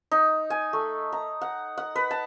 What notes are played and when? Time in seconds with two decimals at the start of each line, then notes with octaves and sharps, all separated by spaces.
0.11 D#4
0.50 G#5
0.73 A3
1.12 A#5
1.41 F#5
1.78 F#5
1.96 B4
2.11 A5